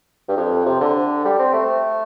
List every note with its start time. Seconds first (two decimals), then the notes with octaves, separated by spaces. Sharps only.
0.29 G2
0.37 F2
0.66 C3
0.81 D3
1.25 G3
1.39 C4
1.53 A3